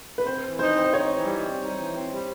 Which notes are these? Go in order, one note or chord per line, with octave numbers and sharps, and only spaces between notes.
B4
C4 C5
E3
D#4 C5
C4
C5
D#4 C#5
E3
G3
C4
D#4
E3
C4
G3